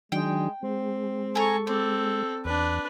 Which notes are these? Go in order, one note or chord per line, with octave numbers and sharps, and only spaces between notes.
D#3 F#3 G#3 D4 G5
G#3 C4
G#4 A4 A#5 C#6
C4 A4 D5
E2 D4 B4